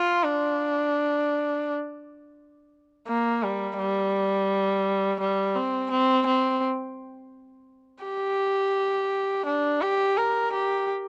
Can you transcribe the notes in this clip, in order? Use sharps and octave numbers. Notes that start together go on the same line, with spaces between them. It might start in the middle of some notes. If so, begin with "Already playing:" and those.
Already playing: F4
D4
A#3
G3
G3
G3
C4
C4
C4
G4
D4
G4
A#4
G4